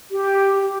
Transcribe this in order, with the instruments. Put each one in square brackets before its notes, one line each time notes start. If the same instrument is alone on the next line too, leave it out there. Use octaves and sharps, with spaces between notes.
[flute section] G4